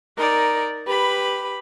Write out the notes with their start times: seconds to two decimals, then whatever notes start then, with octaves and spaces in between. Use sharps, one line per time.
0.17 D#4 A#4 D5
0.86 G4 B4 B5